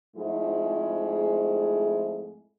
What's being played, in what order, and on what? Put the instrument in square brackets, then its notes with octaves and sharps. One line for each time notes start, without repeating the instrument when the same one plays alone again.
[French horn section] F2 G#2 F3 G#3 A3 E4